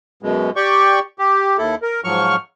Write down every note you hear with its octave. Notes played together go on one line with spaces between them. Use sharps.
F#2 B2 G#3
G4 D5 G5 C#6
G4
D#2 E4 A4
A#4
G#2 F3 F#3 C#6 F6